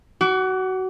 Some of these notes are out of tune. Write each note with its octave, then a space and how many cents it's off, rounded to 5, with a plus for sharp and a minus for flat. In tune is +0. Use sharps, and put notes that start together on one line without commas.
F#4 +20 D6 -30